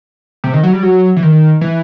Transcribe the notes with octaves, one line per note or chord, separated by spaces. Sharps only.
C3
D#3
F#3
G3
F#3
E3
D#3
E3